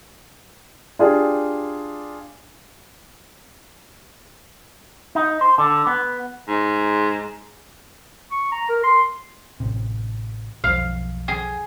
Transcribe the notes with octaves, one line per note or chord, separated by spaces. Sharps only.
D4 F4 G4 G#4
D#4
C5
D3
B3
G#2
C#6
A#5
A#4
C6
A1 C3
B1 F2 F5
G#4